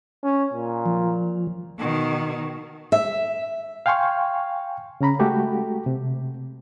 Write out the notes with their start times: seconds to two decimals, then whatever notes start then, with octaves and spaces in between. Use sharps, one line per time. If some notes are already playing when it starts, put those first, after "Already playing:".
0.23 C#4
0.53 A#2
0.86 F3
1.79 B2 D#3
2.92 E5
3.86 F5 G5 G#5 C6 C#6
5.01 C#3 C#4 A#5 B5
5.19 G#3 A3 F#4 G4 A4
5.86 C3